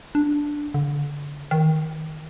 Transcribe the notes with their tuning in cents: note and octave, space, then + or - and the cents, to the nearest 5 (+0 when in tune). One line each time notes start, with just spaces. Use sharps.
D4 +0
D3 -25
D#3 +15